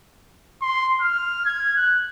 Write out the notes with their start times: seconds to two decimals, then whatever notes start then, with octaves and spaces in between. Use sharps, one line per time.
0.61 C6
1.01 F6
1.46 G#6
1.76 F#6